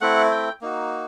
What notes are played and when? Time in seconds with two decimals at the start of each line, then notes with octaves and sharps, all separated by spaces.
0.01 A3 C4 E4 F#5
0.31 G5
0.61 A#3 D#4 F#4